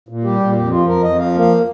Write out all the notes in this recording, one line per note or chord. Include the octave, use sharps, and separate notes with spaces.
A#2
G3 G4
A#2
F2 G4
F3 F4
F2 A#4
F2 D#5
F3 F5
A#3
F5